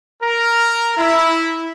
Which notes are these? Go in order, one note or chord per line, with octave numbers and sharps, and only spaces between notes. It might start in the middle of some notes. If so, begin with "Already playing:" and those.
A#4
E4